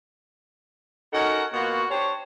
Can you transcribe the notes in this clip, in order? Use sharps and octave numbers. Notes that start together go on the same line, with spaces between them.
C#4 D#4 F#4 A4 A#4 F#5
B2 A#3 F4 F#4
D4 G4 C5 C#5